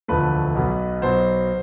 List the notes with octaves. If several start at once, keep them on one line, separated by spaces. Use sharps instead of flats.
E1 D2 D3 F3 A3 B4
B1 B2 F#3 B3
B1 B2 F#3 B3 C5